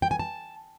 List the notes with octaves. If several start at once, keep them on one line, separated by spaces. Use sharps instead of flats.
G5
G#5
A5